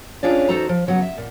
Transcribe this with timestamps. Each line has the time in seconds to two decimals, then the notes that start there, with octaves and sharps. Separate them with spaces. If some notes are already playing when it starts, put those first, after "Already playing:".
0.23 C#4 D4 F4 G#4 C#5 D5
0.49 E2 D#4 F#4 A4 C5 A#5
0.69 F3
0.87 C#3 F#3 B3 F#5
1.02 E5
1.17 A#2